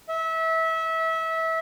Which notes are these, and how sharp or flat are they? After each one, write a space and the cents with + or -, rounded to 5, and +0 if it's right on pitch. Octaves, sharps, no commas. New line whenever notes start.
E5 -25